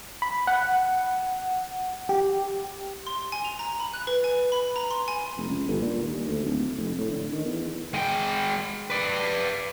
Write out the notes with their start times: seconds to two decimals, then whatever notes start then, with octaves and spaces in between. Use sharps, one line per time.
0.22 B5
0.47 F#5
2.09 G4
3.07 C6
3.32 G#5
3.45 F7
3.59 A#5
3.80 B5
3.93 F#6
4.07 B4
4.24 G#5
4.52 B5
4.76 A#5
4.91 C6
5.08 G#5
5.37 F1
5.48 C#2
5.67 G1
5.81 A#2
6.02 D#2
6.28 D2
6.43 D1
6.77 F1
6.98 A2
7.11 D3
7.32 D#3
7.45 E2
7.94 G#3 G5
8.90 B4 D5